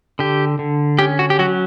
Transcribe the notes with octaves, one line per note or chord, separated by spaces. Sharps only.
D3 G4
D3
C#4 G4
F#4
G4
F#3 F#4